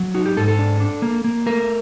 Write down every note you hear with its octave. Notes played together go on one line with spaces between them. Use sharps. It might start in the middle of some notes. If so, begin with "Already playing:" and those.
Already playing: F#3
D#4 F#4
G4
G#2 A4
A4
D4
D4
A#3
A#3
A3 A#4